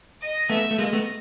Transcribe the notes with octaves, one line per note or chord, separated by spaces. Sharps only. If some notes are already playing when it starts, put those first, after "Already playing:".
D#5
A3 B3 E5
A3
G#3 A#3 D#5
A3 B3